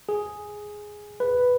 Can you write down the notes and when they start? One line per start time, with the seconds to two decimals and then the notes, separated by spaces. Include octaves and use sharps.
0.09 G#4
1.20 B4